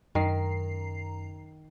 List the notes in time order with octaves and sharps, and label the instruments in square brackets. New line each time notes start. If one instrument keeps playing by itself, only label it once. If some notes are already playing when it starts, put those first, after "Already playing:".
[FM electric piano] F#2 A#5 C7 [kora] D#3